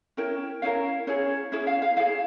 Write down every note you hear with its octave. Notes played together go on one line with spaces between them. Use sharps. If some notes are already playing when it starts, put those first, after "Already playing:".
C#4 E4 A#4 G5
C#4 E4 A#4 F5
C#4 E4 G#4 C#5
C#4 E4 G#4 E5
F5
F5
E4 G#4 F5